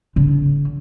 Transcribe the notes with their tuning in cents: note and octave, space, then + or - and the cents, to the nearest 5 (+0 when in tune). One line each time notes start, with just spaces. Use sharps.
D3 -45